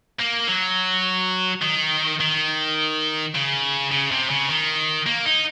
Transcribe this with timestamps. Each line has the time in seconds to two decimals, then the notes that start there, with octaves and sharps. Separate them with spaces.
0.20 A#3
0.48 F#3
1.62 D#3
2.20 D#3
3.35 C#3
3.92 C#3
4.11 C3
4.30 C#3
4.49 D#3
5.06 A#3
5.26 D#4